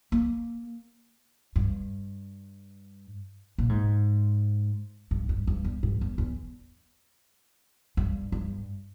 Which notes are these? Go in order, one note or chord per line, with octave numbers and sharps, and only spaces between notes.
A#3
G2
A#2
G#2
G2
G2
G2
E2
G2
E2
E2
G2
G2